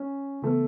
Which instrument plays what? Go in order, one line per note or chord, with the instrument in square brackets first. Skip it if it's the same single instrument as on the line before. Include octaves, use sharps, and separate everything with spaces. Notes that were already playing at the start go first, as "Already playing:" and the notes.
Already playing: [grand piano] C#4
[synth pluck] C#3 E3 B3 [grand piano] A3